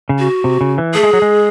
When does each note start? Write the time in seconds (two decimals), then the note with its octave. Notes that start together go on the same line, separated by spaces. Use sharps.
0.09 C#3
0.19 F#4
0.44 C3
0.61 C#3
0.78 E3
0.94 A3 G#4
1.03 G#3
1.13 F#3
1.22 G#3